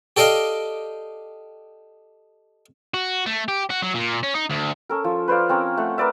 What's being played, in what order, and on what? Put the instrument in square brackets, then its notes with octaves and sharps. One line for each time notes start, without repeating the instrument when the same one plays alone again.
[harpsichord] G4 A4 D5 D#5 F5 G5
[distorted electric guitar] F#4
A3
G4
F#4
F#3
A#2
C#4
D#4
D2
[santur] C#4 A4 A#4
F3
B4 C5 D5 F5
C4 C#4 A#4
A3 F#5
A#4 B4 D5 E5